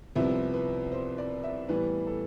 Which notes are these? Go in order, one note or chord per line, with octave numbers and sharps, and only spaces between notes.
C2 C3 F3 B3 E4
B4
C5
D5
E5
A2 E3 G3 B3 B4
A4